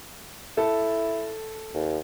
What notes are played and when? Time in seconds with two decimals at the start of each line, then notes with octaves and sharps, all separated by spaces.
0.57 E4 A4
1.74 D#2